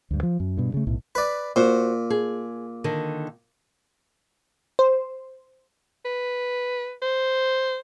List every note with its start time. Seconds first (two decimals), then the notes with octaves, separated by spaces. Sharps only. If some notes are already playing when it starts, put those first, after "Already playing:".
0.11 D2 G2
0.23 F3
0.40 F#2
0.57 G2 B2
0.74 C#3 A3
0.87 B1 A2
1.15 B4 D5
1.56 A#2 F#4 C5
2.10 G#4
2.84 D3 D#3 A#4
4.79 C5
6.05 B4
7.02 C5